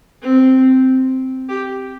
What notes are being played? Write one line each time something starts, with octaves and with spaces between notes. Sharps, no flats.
C4
G4